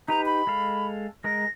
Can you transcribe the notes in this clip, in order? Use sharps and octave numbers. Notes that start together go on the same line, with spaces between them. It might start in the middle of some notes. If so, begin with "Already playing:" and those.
D#4 G4 B4 A#5
B5
G#3 A4 F5
G#3 A#4 A#6